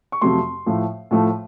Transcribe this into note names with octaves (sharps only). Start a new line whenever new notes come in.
C#6
F2 C3 F#3 A3 C6
A2 F3 A3
A2 F3 A3